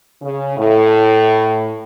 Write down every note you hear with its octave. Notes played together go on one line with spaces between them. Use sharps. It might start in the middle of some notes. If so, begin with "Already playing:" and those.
C#3
A2